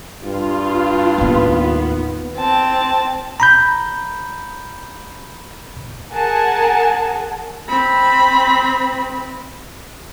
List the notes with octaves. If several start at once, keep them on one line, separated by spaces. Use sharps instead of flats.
G2 F4
D#2 A2 D#3 B3
C4 A5
A#5 B5 G6
G#4 A#4 F#5 G#5 A5
C4 B5